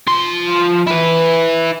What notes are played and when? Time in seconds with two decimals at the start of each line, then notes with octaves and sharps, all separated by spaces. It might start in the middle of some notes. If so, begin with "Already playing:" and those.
0.08 F3 C6
0.87 E4 B4